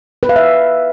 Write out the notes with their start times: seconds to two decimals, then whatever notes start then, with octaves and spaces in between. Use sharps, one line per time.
0.23 B4
0.29 F5
0.36 E5